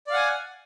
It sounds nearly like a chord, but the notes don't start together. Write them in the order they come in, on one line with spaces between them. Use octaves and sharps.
D5 F5 F#5 G#5